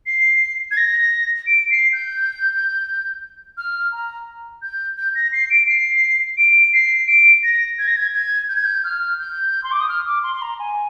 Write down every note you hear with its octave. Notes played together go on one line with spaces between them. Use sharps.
C7
G#6
A#6
D7
C7
G6
F6
A#5
G6
G6
A#6
C7
D7
C7
D7
C7
D7
A#6
G#6
A#6
G#6
G#6
G6
G#6
G6
F6
G6
C6
D6
D#6
F6
D6
C6
C6
A#5
G#5